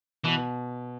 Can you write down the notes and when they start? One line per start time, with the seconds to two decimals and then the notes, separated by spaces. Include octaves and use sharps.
0.24 B2 E3